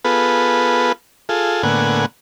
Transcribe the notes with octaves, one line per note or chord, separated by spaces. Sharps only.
B3 F4 G#4 A4 B4
F4 G#4 A4
A2 D3 A#3 B3 F#5 G#5